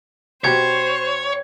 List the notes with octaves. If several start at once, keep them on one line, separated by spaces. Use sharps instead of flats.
B2 G4 C5 C#5 G#6